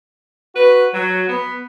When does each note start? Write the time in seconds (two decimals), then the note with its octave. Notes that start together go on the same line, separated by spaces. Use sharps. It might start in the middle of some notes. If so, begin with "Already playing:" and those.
0.55 F#4 B4
0.93 F#3
1.28 B3